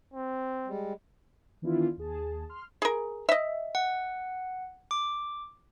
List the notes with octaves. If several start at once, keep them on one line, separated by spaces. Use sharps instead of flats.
C4
G3 G#3
D#3 E3 B3 D4 E4 F4
D#2 G#4 A5
C6 F6
G#4 A#4
D#5 E5
F#5
D6